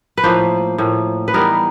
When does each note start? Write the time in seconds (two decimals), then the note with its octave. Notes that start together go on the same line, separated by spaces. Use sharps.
0.18 B4
0.24 A2 F3 A#3 C5
0.78 A2 F3 A#3
1.28 B4
1.34 E3 G3 B3 D#4 A#4